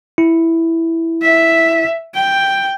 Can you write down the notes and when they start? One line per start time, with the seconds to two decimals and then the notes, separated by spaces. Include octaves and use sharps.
0.18 E4
1.22 E5
2.14 G5